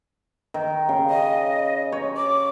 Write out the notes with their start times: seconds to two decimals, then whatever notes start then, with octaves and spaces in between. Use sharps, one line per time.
0.54 D#3
0.89 C#3
1.10 D#5
1.92 C#5
2.17 D6